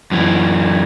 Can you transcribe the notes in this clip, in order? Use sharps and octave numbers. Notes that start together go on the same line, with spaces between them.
F#2 E3